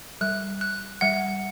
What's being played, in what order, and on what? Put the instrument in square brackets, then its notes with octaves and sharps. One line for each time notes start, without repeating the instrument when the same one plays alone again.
[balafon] G3 [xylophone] F#6
[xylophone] F#6
[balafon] G3 [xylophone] F#5